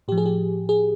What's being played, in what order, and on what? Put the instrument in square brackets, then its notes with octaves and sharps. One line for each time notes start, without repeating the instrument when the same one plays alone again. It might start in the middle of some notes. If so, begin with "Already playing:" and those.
[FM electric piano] A2 F3 G4
G#4
G4
G#4